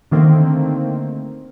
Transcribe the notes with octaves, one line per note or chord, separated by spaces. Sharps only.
D3 D#3 A3 A#3 C4